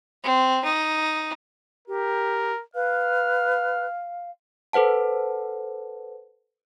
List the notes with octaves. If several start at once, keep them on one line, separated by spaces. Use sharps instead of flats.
C4
D#4
G4 A#4
B4 F5 F6
A4 B4 C5 F#5 A5